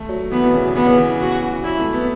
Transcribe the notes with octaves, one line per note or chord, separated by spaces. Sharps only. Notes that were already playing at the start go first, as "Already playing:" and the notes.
Already playing: A3
F#3
E3 B3
B2
C#3
F#3
E3 B3
C#3
E3
F#4
F#3 E4
A3
B3